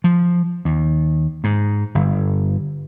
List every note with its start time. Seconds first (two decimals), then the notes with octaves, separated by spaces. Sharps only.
0.04 F3
0.65 D#2
1.44 G#2
1.95 G1